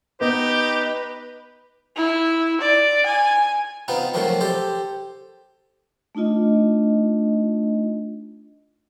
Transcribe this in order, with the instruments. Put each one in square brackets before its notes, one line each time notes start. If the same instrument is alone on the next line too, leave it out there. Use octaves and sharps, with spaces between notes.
[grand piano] B3 [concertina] D#4 D#5 [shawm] G4 [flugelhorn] B4
[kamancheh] E4
D5
G#5
[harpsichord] B3 C4 D#4 F4
D#3 F3 F#3 A3 A#3 C4
G4 A4 C5
[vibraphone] A3 D4 D#4 F4 D#5